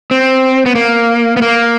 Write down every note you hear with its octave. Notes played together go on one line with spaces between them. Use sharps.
C4
B3
A#3
B3
A#3